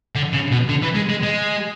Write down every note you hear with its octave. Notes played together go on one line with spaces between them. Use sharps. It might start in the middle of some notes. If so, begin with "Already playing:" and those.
D3
C#3
B2
D3
E3
G#3
G#3
G#3